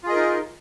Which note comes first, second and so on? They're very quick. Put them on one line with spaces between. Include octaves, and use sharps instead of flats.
F4 G#4 D#5 A#4 D#4